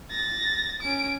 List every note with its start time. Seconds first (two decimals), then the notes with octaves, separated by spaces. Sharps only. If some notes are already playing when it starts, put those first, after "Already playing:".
0.11 A6 A#6
0.82 C#4 D7